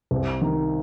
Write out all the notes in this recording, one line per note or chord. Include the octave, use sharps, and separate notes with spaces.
C2
D#3